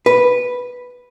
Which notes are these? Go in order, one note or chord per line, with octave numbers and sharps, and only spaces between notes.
B4